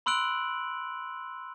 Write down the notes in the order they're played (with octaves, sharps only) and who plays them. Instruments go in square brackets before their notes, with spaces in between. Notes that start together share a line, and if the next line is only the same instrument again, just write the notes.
[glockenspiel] B5 C6 E6 F#6 D7 F#7